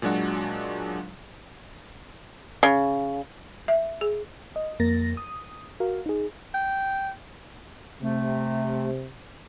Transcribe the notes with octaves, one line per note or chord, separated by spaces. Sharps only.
A#2 F#3 G#3 D4 F#4
C#3
E5
G#4
D#5
F2 A#3 A#4 A6 A#6
D#6
F#4 A#4 F5
D#4 G#4
G5
C3 A3